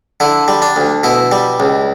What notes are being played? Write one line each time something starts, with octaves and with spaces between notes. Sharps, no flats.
D3 E4
G3
D4
D2
B2 E4
G3
C#2